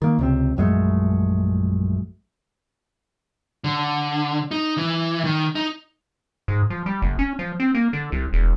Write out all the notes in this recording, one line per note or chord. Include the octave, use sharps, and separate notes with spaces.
D#3 A#3
C#2 C3 C4
A#1 F#2 G#3 A3
D3
D#4
E3
D#3
D#4
G#2
F3
G3
F#1
C#4
F3
C4
A#3
D3
C2
E1